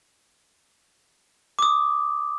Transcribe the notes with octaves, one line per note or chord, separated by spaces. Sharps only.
D6 D#6